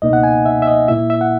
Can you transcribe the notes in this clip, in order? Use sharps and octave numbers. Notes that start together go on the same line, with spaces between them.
C#2 B2 A#3 D#4 D#5
F#5
G#5
E5
E5
D#5
A#2 A#3 E4 E5
E5
F#5